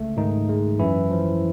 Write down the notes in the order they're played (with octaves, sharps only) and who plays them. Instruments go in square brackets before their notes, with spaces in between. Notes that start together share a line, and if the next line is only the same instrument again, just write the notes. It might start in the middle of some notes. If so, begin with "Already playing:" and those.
Already playing: [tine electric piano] C#2 A3
G#2 D#3 D#4
G#3
F#2 E3 E4
F3